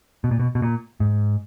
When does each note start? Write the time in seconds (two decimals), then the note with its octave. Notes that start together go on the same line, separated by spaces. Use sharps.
0.24 B2
0.31 A#2
0.39 B2
0.55 B2
0.62 A#2
1.00 G#2